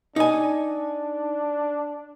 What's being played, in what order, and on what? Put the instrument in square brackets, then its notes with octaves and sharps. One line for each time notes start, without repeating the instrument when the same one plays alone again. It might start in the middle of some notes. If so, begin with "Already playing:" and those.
[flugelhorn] D4 [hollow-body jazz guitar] D#4 G#5